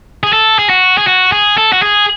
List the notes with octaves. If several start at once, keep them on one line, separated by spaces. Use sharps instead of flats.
G#4
A4
G#4
F#4
G#4
F#4
G#4
A4
F#4
G#4